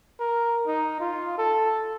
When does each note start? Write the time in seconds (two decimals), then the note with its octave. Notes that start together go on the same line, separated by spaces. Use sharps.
0.19 A#4
0.67 D#4
1.00 F4
1.38 A4